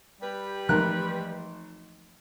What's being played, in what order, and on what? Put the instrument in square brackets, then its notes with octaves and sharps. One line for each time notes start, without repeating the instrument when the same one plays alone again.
[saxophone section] G3 G4 B4
[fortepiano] G#1 A#4 F#6 [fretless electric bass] E3 F3 A3